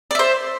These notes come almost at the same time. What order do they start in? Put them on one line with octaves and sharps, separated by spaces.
D5 E5 C5